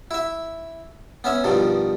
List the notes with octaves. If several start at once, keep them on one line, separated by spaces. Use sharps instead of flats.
E4 E5
B3 C#4 E5
G2 B2 D#3 F3